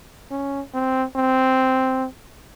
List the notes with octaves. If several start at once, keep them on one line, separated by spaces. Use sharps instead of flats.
C#4
C4
C4